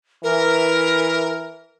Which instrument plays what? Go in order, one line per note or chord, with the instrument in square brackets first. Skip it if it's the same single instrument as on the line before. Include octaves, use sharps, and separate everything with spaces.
[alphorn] E3 [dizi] A#4